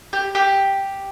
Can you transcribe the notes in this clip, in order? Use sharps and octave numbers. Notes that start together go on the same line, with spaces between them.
G4
G4